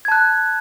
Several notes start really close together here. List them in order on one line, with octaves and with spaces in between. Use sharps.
G#6 A5 F#6